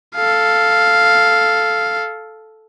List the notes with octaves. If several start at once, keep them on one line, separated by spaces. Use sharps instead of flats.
A4 F5